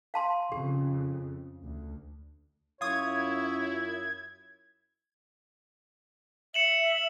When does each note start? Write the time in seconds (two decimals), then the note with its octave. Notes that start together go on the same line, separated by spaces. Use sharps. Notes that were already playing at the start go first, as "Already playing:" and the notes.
0.14 F5 A5 C6
0.52 F2 C#3 G4
1.64 D2
2.81 F#2 E4 F4 C#5 D#6 G#6
6.54 E5 C#7 E7 F#7